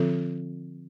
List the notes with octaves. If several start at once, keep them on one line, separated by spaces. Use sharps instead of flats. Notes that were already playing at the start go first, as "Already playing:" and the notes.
Already playing: D3 F3 C4 F4 A4